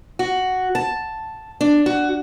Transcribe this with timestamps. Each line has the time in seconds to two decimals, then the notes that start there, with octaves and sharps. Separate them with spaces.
0.19 F#4
0.75 A5
1.61 D4
1.86 F#4